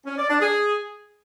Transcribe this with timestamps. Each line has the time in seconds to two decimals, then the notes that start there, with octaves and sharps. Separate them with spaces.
0.06 C#4
0.18 D5
0.29 D4
0.40 G#4